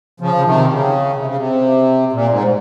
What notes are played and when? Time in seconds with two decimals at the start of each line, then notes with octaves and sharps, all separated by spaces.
0.20 C#3 F3
0.34 C#3
0.44 C3 D#3
0.68 C#3
1.16 C3
1.27 C#3
1.36 C3
2.12 A#2
2.29 G#2